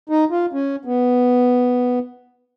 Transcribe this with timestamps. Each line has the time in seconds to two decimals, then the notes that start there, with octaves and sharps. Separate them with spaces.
0.09 D#4
0.31 F4
0.53 C#4
0.85 B3